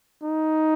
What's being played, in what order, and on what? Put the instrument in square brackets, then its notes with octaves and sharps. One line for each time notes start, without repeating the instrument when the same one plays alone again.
[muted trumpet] D#4